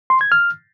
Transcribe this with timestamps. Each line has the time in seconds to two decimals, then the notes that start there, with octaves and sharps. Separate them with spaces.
0.10 C6
0.21 G#6
0.32 F6